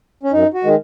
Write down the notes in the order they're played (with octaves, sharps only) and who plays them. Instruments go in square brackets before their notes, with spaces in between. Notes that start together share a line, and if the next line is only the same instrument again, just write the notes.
[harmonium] C#4
F#2 D#4
F#4
D#3 G#3